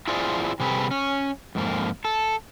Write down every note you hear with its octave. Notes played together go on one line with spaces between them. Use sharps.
E4 F4 G#4 C5 D5
C3 G3 G#4 A4 B4
C#4
F2 G#2 A#3
A4